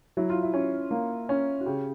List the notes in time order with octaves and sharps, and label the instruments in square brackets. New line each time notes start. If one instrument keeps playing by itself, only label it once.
[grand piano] F#3 [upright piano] E4
[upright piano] F4
E4
[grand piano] C#4
A#3
C#4
[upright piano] F#4
[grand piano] C#3 [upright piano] G4